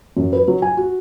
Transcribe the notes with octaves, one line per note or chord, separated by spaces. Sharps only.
F#2
B4
F#3
G#5
F#4